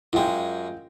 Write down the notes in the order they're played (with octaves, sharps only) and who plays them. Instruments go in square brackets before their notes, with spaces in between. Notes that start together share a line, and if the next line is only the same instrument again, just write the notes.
[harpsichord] F#2 G#3 [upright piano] F4 G5